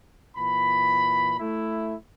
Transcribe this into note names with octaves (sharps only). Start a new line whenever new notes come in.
A#2 E3 B5
A3 E4